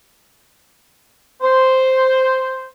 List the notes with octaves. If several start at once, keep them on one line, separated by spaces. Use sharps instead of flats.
C5